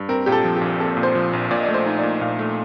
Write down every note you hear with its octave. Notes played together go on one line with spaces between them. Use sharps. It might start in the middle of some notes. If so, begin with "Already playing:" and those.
Already playing: G2
C4 A#4
A#2 G4
A4
F3
A#1 G4
C4 A4
A#2
C5
F3
A#1
A#2 D5
D#5
D5
A3
C5
D#4
D5
A#2
A#2 F5
A3